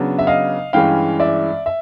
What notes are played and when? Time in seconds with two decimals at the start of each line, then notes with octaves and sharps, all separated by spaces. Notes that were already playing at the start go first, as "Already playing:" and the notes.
Already playing: C#3 F#3 B3 D4
0.19 E5
0.27 D#5 F5
0.73 G2 E3 G#3 C#4 F5 G5
1.20 D5 E5
1.66 E5